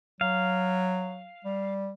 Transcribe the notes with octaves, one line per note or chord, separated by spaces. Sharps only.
F#3 F5
G3